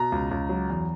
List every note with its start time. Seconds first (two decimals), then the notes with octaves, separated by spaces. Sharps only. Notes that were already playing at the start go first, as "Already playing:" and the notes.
Already playing: B2 A#5
0.12 C#2
0.31 C#2
0.49 F#3
0.69 E2